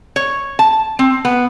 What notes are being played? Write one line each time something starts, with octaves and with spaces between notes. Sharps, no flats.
C#5
A5
C4
B3